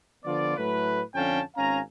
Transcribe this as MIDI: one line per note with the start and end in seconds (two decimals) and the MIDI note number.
0.24 0.56 50
0.24 0.56 53
0.24 0.56 59
0.24 0.56 65
0.24 0.56 74
0.57 1.00 45
0.57 1.00 54
0.57 1.00 57
0.57 1.00 71
1.15 1.40 41
1.15 1.40 50
1.15 1.40 61
1.15 1.40 77
1.15 1.40 79
1.15 1.40 81
1.56 1.79 32
1.56 1.79 61
1.56 1.79 77
1.56 1.79 80
1.56 1.79 82